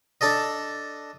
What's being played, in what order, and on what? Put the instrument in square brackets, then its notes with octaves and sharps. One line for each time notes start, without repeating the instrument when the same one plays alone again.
[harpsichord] D4 A4 D5 D#5